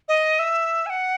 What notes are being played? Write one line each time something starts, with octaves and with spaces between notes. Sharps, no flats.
D#5
E5
G#5
F#5